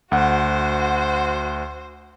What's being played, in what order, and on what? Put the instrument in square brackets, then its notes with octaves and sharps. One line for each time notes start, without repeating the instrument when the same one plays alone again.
[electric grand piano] D2 F#5 [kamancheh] F#4 C5